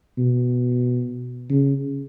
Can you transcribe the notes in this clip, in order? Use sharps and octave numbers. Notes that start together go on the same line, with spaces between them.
B2
C#3